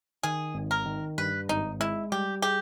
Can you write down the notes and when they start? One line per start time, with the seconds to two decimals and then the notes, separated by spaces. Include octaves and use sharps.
0.23 D#3 G#4
0.54 G#1
0.71 A#4
0.86 D#3
1.18 G2 B4
1.49 G#1 D#4
1.80 G#3 E4
2.12 G3 G4
2.42 G4 G#4